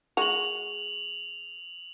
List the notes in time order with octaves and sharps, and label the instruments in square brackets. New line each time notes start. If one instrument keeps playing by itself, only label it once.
[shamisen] G#3 F#4 [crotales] F7 F#7